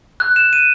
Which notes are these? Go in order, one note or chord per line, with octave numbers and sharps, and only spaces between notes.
F#6
E7
D#7